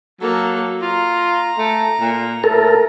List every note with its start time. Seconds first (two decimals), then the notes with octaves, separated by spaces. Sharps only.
0.21 F#3 A#3 A4
0.82 F4 A#5
1.57 A3
2.00 A#2
2.44 A2 A4 A#4